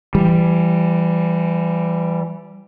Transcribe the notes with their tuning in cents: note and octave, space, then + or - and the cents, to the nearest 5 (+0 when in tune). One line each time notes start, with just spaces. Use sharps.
E3 +30 G3 +0